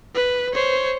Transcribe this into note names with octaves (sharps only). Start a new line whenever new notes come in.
B4
C5 C#5